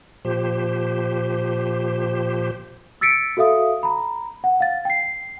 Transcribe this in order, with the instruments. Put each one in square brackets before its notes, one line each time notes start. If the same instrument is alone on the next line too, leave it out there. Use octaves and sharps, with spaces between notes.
[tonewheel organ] A#2 F3 G4 C5
[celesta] E6 A6 B6 C#7 D7
F#4 A4 E5 F5 D#6
A#5 B5
F#5
F5 A6
G5 C7